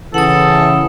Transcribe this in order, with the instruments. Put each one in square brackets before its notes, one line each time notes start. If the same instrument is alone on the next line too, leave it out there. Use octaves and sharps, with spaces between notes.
[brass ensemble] C#3 E3 [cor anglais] A4 [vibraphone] F#5 D#6